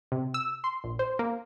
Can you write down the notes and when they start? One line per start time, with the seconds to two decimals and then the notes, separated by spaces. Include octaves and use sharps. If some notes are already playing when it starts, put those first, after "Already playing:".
0.12 C3
0.34 E6
0.64 C6
0.84 A#1
0.99 C5
1.19 A#3